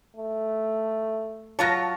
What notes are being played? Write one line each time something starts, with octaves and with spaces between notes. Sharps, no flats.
A3
F#3 F4 C#5 A5 A#6